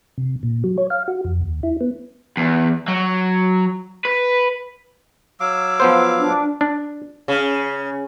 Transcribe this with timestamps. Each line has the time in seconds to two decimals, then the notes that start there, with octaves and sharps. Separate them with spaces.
0.18 C3
0.43 A#2
0.64 F#3
0.78 C#5
0.90 F5
1.08 F#4
1.25 F2
1.41 D#2
1.63 E4
1.81 B3
2.37 E2
2.88 F#3
4.05 B4
5.40 F#3 F5 D6 E6
5.80 F3 B3 C5
6.18 D4
6.61 D4
7.28 C#3